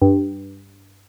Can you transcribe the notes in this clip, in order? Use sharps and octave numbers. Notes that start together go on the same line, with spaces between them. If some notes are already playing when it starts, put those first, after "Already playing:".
G2